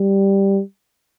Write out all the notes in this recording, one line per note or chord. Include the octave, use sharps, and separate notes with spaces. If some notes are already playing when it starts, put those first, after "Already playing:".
Already playing: G3